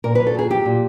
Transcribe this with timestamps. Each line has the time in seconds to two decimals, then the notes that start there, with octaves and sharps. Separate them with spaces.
0.04 A#2 A#4
0.15 F#3 B4
0.27 A4
0.34 A#2 G#4
0.50 F#3 G4
0.65 A#2